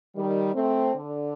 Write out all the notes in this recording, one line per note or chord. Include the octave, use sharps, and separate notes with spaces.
D#3 G3
A3 C4
D3